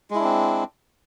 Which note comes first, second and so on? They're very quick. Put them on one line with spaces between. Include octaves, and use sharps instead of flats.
G#3 E4 D4 C4